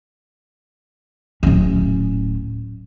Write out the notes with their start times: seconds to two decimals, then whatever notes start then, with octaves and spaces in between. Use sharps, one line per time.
1.43 D1 C#4